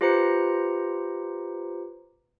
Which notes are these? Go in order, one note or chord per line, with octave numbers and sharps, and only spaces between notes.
F4 G4 B4 C5 A#5 C#7